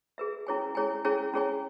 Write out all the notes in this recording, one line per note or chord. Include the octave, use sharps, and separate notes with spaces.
G#4 B4 E5
C#4 E4 G#4 C#5 G#5
C#4 E4 G#4 C#5 G#5
C#4 E4 G#4 C#5 G#5
C#4 E4 G#4 C#5 G#5